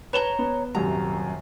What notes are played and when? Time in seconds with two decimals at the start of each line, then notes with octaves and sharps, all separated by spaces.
0.13 B4 C#5 A#5 E7 G7
0.39 B3
0.75 D#1 F#2 C3 A#5